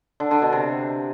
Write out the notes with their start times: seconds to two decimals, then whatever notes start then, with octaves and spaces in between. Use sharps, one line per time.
0.20 D3
0.31 D3
0.42 B2
0.53 C3